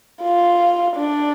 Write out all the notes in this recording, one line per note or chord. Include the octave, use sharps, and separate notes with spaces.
F4
D4